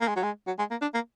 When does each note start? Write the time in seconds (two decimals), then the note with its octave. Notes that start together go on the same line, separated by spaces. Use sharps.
0.01 A#3
0.08 G#3
0.16 F#3
0.23 G#3
0.47 F#3
0.59 G#3
0.71 A#3
0.82 D4
0.94 A#3